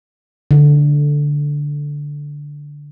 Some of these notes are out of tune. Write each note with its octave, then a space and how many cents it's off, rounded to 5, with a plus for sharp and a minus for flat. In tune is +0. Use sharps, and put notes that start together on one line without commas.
D3 -5